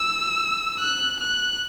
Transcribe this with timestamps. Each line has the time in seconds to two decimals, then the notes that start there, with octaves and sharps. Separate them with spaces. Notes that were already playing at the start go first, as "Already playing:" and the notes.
Already playing: E6
0.79 F#6
1.20 F#6